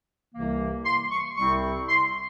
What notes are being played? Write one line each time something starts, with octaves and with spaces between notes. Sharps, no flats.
C2 C3 E3 A#3
C6
C#6
C2 C3 G3 C4 E4 C#6
C6